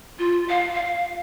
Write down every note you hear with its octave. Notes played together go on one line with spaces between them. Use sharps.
F4
F5
F5